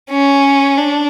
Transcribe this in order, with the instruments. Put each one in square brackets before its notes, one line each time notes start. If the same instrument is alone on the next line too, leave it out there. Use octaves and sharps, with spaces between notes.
[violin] C#4
D4